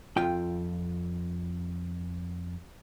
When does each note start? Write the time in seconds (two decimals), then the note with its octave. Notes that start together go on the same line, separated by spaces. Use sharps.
0.17 F2 F4 G5